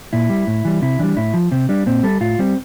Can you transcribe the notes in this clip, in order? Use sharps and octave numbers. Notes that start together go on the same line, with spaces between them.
A#2 E4
G3
A2
E3 G3
C3 E4
E3 G3 D4
A2 E4
F3
C3 C4
G3 D4
A#2 C4
G3 A4
A2 F4
G3 C4